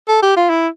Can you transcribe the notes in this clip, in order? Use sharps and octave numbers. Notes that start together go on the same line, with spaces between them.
A4
G4
F4
E4